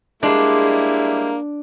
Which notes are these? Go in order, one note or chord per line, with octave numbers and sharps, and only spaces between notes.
G3 G#3 A#3 D4 E4